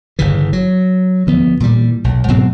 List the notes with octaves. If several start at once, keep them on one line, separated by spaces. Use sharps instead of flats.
G1 C#3 E3
F#3
D2 F3 B3
A#2 E3 G3
B1
G#2 B2 F#3 C4